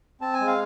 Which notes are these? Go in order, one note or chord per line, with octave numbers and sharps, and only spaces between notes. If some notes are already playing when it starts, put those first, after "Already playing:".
C4 A5
G#5
G#3
F5